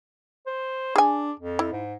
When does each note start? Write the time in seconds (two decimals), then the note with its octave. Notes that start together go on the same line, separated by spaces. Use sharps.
0.47 C5
0.96 D4 G#4 G#5
1.40 F2
1.59 E4
1.72 G#2